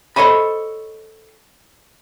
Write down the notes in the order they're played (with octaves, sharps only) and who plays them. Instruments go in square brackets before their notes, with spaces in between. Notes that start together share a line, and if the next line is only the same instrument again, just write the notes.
[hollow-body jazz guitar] A4 C5 C#5 D#5 B5